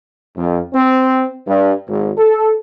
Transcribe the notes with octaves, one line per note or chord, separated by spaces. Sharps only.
F2
C4
G2
G#1
A4